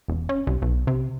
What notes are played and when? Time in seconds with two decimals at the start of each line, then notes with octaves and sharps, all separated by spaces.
0.08 E1
0.29 C#4
0.47 C2
0.62 B1
0.87 C3